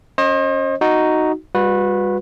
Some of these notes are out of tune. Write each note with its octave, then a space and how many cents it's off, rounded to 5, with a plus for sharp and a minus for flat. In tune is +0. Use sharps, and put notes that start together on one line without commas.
C#4 +0 C5 +40 D#5 +0
D#4 +0 F#4 +0
G3 +25 F#4 -35 B4 +0